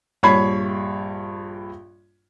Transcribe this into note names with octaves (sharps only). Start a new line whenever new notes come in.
A#1 G2 C#5 B5 G#6 C7